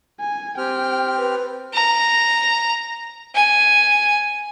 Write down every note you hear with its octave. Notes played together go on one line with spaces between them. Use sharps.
G#5
C4 G4 G5 F6
B4
A#5
G#5